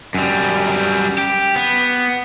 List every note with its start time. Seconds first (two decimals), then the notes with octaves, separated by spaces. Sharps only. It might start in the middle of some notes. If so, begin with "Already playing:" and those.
0.14 F#2 G3
1.18 G4
1.56 B3